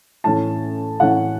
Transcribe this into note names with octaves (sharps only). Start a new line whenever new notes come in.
A2 E3 C#4 A5
A2 E3 C#4 F#5